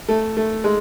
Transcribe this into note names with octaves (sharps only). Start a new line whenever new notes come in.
A3
A3
G#3